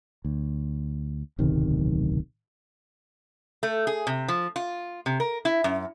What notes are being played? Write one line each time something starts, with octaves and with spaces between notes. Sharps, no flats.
D2
D1 B1 C3 D#3
A3
G#4
C3
F3
F4
C3
A#4
E4
F#2